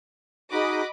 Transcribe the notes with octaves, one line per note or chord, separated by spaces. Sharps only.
D#4 F#4 G#4 D#5 B5 D6